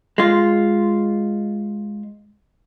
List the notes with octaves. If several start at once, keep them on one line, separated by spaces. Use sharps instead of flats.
G#3 F4